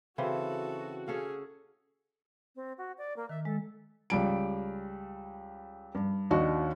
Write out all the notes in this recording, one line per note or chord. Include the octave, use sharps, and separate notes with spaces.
C#3 E3 C4 F#4 A4
C#4 G#4 A4 F5
C4
F#4
D5
A#3
D#3 E5
G#3 A4
C#2 G3 D7
G2
D#2 D4 D#4 F#4